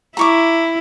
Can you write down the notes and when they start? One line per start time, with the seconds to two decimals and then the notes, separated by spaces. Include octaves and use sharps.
0.17 E4 A#5 C#6 D6